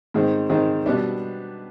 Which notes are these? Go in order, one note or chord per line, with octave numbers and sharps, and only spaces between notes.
G#2 D#3 G#3 C4
G#2 D#3 G#3 C4
B2 G3 B3 D4